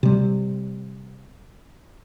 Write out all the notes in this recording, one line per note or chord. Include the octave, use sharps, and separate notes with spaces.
C3 G3